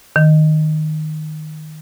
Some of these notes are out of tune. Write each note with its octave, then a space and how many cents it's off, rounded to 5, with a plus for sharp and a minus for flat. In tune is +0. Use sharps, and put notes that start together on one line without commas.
D#3 -5